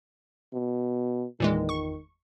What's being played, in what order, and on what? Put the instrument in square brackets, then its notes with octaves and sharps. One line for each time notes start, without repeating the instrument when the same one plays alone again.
[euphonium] B2
[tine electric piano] G1 E2 [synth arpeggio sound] A#2 E3 G#3 [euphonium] D#3
[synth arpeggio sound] C#6